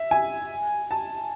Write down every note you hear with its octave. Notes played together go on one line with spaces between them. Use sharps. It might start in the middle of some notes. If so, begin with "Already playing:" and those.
Already playing: E5
G#5
A5